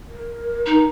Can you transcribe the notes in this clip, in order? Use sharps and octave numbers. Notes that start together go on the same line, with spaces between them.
A#4
D#4